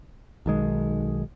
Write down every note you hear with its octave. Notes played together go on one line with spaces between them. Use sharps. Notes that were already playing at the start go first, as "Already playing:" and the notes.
B1 D#3 G#3